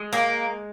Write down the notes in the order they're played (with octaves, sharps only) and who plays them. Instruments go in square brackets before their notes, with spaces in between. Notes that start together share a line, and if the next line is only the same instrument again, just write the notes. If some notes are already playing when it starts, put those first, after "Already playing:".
Already playing: [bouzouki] G#3
A#3